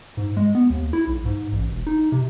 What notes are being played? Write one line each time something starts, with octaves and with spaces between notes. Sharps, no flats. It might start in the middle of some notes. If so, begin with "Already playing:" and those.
G#2
G#3
B3
D#2
E4
B1
G#2
A1
E1
D#4
C3